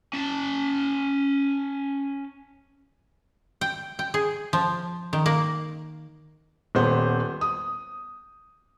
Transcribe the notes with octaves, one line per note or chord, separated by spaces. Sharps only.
C#4 A5
G5
G5
G#4
F3
D#3
A#3
D#1 B3 C5
D#6